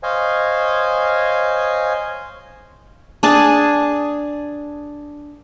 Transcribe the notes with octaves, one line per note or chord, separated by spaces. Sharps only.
C5 C#5 D#5 F5 G#5
D4 G#4 A5